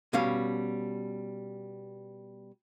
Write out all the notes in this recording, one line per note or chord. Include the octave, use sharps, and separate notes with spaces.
B2 G3 C#4 F5